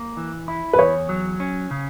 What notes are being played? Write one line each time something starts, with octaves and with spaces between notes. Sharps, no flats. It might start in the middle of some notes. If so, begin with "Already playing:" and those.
Already playing: A#3
E3
E4
B4
E2 C#5
F#3
C#4
C#3